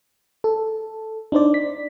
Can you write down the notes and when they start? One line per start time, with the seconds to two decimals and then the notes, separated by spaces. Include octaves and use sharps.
0.44 A4
1.32 D4 D#4 C5 D5
1.54 B6